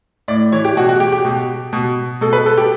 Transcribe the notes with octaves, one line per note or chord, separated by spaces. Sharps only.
A2 D5
E3 C#5
G4
B2 F#4
F#4
G4
G4
B2
B2
B2 A4
B4
A4
G4